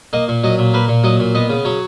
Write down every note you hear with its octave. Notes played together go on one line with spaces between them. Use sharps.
A#3 D#5
A#2
F#3 D#5
A#2
A#3 B4
A#2
F#3 D#5
A#2
B3 D#5
C#3
F#3 C#5